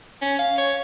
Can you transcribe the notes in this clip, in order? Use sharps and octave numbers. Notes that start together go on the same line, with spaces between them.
C#4
F5
C#5